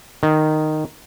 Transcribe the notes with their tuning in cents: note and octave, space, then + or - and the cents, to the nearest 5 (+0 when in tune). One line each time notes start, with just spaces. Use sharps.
D#3 -10